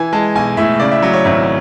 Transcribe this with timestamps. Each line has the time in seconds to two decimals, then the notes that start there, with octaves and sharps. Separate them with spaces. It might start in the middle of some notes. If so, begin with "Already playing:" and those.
Already playing: E3 G#5
0.13 G#3 A5
0.35 B1 G#5
0.57 A2 E5
0.80 C#3 D5
0.91 E5
1.02 F#3
1.13 C#5
1.25 G#1 E5